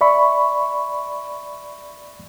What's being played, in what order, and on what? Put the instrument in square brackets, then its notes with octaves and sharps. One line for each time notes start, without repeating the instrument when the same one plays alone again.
[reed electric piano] D5 E5 B5 C#6